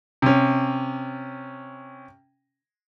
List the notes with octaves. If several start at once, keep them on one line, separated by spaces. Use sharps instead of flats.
C3 C#4